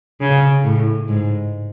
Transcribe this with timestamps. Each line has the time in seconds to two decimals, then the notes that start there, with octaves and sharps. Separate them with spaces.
0.21 C#3
0.64 A2
1.08 G#2